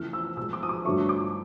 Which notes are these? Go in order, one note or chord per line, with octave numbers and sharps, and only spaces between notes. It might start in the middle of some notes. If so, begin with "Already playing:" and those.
Already playing: E2 C#3 E3 A3 F6
E6
B2 G#3 E6
D6
D#6
D6
G2 D3 F#3 A3 C#6
D6